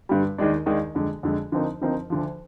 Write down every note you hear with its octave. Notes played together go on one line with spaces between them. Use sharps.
G2 D3 G3
D#2 D#3 G#3 D4
D#2 D#3 G#3 D4
F2 D3 G#3
F2 D3 G#3
D3 F3 C4 D#4 A#4
D3 F3 C4 D#4 A#4
D2 D3 F3